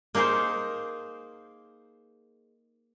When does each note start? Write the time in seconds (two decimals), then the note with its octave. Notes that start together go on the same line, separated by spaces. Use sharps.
0.15 A#3 D#4 G#4 A#4 C5